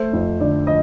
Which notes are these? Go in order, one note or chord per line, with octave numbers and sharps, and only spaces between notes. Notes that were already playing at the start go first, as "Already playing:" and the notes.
Already playing: A3 C5
F2
D3 D5
F3 D#5